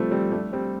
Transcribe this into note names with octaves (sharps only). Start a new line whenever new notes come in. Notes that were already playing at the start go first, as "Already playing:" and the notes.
Already playing: F3 G3 A3 C4
G3 C4
A3 D4
G3 C4